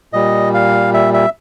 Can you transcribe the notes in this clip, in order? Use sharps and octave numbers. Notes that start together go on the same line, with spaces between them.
A#2 G3 D#5
F5
E5
E5